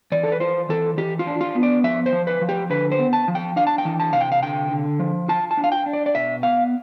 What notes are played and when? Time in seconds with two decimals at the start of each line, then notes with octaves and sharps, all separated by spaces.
0.12 E3 D5
0.24 A4
0.32 B4
0.40 F4 C5
0.69 E3 A4
0.97 E3 G4
1.19 F4
1.27 D4
1.41 F4
1.55 B3
1.63 D5
1.84 F3 E5
2.06 C5
2.12 F3
2.27 B4
2.41 F3
2.49 G4
2.70 D3 B4
2.92 C5
2.99 B3
3.13 A5
3.28 F3
3.35 G5
3.56 D4 F5
3.67 A5
3.78 G5
3.85 E3
4.00 A5
4.13 C3 F5
4.21 G5
4.32 F5
4.42 D3 G5
4.71 D3
5.00 F3
5.29 F4 A5
5.51 A5
5.57 D4
5.64 F5
5.72 G5
5.86 D4
5.93 D5
6.06 D5
6.15 B2 E5
6.43 B3 F5